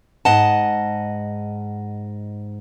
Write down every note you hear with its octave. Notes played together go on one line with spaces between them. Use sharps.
G#2 D#5 F#5 A5